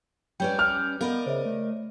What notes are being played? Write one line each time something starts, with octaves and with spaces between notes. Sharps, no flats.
G3 C#4 B4 C#5 D5 G5 G6
F6
B3 A#4 D5 D#5 F5 B5 G6
C#3 C5 C#5 E5
A3